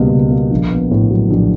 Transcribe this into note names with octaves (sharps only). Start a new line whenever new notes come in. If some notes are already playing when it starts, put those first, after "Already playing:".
Already playing: C#2 B2 G3 A#3
C#2
A#3
A#1
B3
A2
F#3
A#1